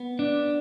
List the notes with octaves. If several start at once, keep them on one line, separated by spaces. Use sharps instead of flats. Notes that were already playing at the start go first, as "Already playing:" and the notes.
Already playing: B3
D4